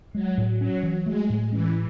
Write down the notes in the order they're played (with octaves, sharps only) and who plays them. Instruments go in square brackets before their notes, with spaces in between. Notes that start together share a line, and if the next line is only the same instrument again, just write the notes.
[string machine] F#3 [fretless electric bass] G#3
[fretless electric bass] A2
[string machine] F#3 [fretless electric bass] C#4
[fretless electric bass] E3
[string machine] G#3 [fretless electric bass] A3
[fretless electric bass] A2
[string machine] E3 [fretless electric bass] C#4